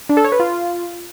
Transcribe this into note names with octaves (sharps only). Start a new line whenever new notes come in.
D4
A4
C#5
B4
F4